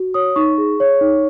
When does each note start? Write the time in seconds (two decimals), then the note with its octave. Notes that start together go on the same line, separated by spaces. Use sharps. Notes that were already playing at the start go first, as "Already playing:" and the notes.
Already playing: F#4
0.14 C#5 D#6
0.36 D#4 C#6
0.58 G#4
0.80 C#5
1.01 D#4